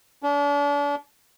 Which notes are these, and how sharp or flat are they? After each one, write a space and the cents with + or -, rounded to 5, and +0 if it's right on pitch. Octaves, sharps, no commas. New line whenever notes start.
D4 -40